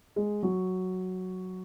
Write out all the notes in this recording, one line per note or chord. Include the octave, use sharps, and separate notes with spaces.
G#3
F#3